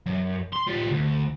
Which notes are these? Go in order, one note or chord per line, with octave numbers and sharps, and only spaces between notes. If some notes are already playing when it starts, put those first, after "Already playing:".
F#2
C6
G3 F4
D2